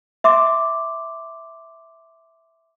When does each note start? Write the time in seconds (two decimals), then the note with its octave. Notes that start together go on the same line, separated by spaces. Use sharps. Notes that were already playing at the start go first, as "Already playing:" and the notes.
0.24 E5 C6 D6